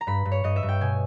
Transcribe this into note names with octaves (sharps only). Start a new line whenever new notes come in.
A#5
G2 B5
G2
C#5
G2 D#5
E5
G2
G5
B2 G#5